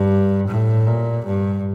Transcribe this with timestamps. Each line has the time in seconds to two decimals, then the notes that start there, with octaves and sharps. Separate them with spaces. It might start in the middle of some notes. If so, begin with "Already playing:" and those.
Already playing: G2
0.48 A2
0.86 A#2
1.25 G2